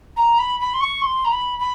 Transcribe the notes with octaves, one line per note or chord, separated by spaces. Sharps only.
A#5
B5
B5
C6
C#6
C6
A#5
B5
B5